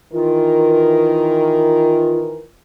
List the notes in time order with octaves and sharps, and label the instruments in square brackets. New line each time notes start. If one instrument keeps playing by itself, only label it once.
[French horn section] D#3 E3 A#4 [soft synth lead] F4